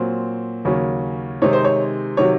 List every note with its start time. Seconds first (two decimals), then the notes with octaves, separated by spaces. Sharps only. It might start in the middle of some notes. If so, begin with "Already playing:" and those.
Already playing: A#2 F#3 C4
0.65 D#2 C#3 F#3 C#4
1.42 C3 D#3 G#3 C4 D#4 C#5
1.53 C5
1.65 C#5
2.17 C3 D#3 F#3 C#5